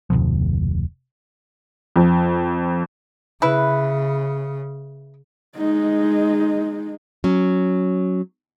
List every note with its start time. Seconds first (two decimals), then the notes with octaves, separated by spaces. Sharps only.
0.10 F1 D2 B2 F3
1.96 F2
3.42 C#3 E4 B4
5.57 G#3 D#4
7.24 F#3 C#4